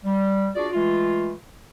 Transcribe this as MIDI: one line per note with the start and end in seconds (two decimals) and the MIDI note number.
0.05 0.48 55
0.56 0.68 62
0.56 0.68 65
0.56 0.68 66
0.56 0.68 68
0.56 0.68 74
0.73 1.33 52
0.73 1.33 56
0.73 1.33 57
0.73 1.33 65